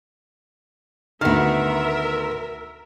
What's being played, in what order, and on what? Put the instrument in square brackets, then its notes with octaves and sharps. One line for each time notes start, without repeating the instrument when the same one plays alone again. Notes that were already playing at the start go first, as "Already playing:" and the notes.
[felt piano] D2 F6 [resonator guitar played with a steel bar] D#3 B3 [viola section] A#4 E5